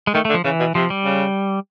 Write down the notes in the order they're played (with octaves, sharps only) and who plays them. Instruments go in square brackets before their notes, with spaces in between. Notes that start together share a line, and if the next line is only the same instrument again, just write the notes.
[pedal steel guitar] G#3
[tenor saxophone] D#3 [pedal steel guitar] A3
[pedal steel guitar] A3
[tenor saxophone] D3
[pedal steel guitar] F3
[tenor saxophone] C#3 [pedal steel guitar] E3
[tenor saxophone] B2
[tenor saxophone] C3 [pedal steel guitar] F3
[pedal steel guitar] G3
[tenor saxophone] C#3